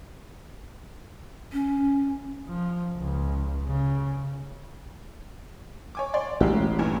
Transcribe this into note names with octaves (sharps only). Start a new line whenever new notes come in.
C#4
F3
C#2
C#3
C#5 G#5 D6
C#5 D5 C6
A1 G#3 F#4 G4
G2 A#2 E3